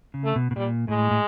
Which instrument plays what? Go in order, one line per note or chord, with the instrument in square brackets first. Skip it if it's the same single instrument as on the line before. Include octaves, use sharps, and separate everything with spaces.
[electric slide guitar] C#3
[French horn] A3
[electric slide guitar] B2
B2
[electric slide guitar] A#2 [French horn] G3
[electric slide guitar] A2 [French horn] G#3
[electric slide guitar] A2